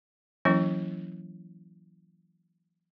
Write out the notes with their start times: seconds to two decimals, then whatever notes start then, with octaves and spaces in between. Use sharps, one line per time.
0.45 E3 F#3 A#3 C#4 E4